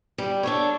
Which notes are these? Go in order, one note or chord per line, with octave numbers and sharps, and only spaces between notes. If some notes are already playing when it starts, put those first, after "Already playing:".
G3
D4 A4 C#5